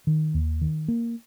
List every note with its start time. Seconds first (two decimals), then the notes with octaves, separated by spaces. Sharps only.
0.07 D#3
0.34 D#2
0.61 D#3
0.88 A#3